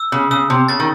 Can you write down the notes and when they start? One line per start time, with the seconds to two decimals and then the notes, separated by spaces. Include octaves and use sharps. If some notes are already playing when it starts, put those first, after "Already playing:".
Already playing: E6
0.12 C#3
0.31 C#3 E6
0.50 C3
0.69 C#3 A6
0.80 D#3